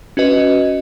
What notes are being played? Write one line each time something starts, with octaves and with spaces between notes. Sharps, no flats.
C#4 F#4 B4 D#5